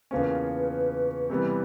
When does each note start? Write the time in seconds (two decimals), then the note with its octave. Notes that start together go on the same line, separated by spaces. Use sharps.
0.11 E2 C#3 F3 A#3 C#4 B4 C5
1.30 C3 E3 G3 B3